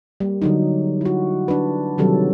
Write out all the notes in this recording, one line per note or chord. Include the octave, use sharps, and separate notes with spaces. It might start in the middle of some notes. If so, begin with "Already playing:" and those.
G3 A#3
D3 F#3 D#4
E4 F#4
D4 B4
C3 D#3 F#3 G3 A4